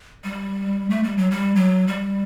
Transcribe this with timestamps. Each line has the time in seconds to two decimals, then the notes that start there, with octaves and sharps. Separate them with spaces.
0.24 G3
0.90 A3
1.03 G3
1.17 F#3
1.31 G3
1.56 F#3
1.88 G3